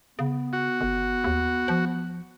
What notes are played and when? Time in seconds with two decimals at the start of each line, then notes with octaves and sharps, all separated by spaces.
0.19 C#3 B3
0.53 F#4
0.81 G1
1.24 D#2
1.68 F3